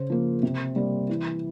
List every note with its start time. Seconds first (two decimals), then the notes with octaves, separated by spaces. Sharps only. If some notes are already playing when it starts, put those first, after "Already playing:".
Already playing: C#3 C5
0.10 F3 A#3
0.43 C3
0.76 G3 A#3
1.09 E3